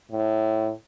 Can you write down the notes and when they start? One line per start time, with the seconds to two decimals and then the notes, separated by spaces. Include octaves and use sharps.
0.11 A2